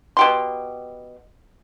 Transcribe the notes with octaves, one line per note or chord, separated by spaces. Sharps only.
B2 G4 C6